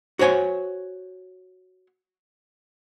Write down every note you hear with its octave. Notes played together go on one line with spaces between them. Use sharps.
F#4 C5 C#5 G#5